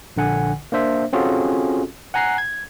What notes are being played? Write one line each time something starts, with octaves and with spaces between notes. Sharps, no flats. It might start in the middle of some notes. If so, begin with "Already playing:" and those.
A#1 D3 F#5 G#5
A#3 D4 C5 E5
C4 C#4 F4 F#4 G#4 A4
F#5 G#5 A#5 F#6 C7
G#6